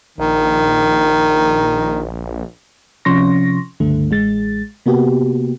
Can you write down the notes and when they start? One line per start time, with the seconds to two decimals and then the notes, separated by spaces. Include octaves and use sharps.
0.18 A#1 D#3
3.05 C3 F3 C#4 C6 C#6 A#6
3.80 C#2 G2 D3 A3
4.11 A1 G#3 A6
4.86 C3 A#3 B3 F#4 G4